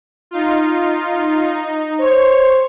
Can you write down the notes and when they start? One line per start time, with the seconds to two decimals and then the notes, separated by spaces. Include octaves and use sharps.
0.31 D#4 F4
1.41 D#4
2.00 C5 C#5